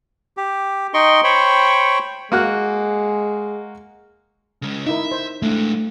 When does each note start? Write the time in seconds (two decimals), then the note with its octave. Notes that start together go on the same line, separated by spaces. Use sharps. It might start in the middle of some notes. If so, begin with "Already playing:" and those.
0.37 G4
0.94 D#4 D#5 G5 C6 C#6
1.24 C5 C#5 G5 B5 C#6
2.32 G#3 A#3 F#4 F#6
4.62 C#3 G#3
4.86 D#4 E4 A#4 E5
5.12 C5
5.42 G#3 A3 D4